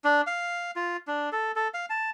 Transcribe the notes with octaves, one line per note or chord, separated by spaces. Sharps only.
D4
F5
F4
D4
A4
A4
F5
A5